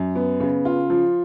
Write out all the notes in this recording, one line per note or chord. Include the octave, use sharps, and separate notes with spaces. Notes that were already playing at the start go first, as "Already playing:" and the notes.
Already playing: F#2
B3
C#3
F4
F3